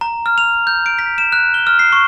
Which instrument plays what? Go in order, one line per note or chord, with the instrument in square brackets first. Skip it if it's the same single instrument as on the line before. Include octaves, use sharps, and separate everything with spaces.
[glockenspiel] A#5
F6
F7
G6
D7
B6
E7
F#6
G7
F6
C7
C#6